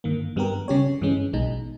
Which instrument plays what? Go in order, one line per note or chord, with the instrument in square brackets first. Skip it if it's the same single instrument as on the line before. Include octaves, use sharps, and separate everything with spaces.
[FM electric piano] G2 D#3 A#3
G2 G3 B3 G4 A#4
C#3 G3 C#4 G4 C#5
G2 E3 G#3 C#4
B1 B2 G#3 D#4